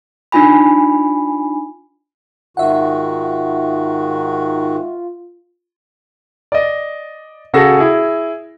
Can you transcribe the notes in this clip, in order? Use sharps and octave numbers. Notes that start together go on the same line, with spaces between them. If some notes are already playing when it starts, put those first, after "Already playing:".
D4 D#4 F4 G#5 B5
G#2 D#3 F4 F#4 E5 F#5
D5 D#5
C#3 F#4 G#4 A4 A#6
E4 G#4